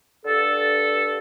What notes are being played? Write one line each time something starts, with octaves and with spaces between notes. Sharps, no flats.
G2 D3 A4